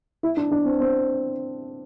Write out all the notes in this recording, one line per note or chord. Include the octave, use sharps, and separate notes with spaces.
E4
D4
D4
C4
C4